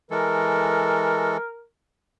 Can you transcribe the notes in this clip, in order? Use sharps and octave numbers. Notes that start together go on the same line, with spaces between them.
E3 G#3 A4 A#4